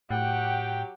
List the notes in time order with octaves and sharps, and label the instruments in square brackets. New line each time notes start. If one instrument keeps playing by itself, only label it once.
[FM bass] A2 [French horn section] F#3 G4 [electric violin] F#5 [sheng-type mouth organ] G5